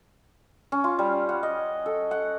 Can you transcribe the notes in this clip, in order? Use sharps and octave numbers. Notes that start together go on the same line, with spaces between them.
C#4
F4
G3
F#5
D#5
A4
F#5